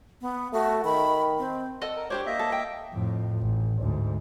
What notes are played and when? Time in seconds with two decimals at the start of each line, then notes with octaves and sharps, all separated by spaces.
0.22 B3
0.53 A3 F#4
0.85 D#3 B5
1.38 C4
1.81 A4 D#5 F#5
1.96 A#4
2.10 D4 G4 C5 C#5 D6
2.26 A#3 D#5 E5
2.39 A4
2.52 G5
2.93 F2 A2
3.39 A1
3.81 D2 G#2